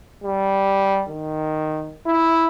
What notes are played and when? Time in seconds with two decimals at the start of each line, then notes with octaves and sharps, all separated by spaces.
0.24 G3
1.09 D#3
2.06 E4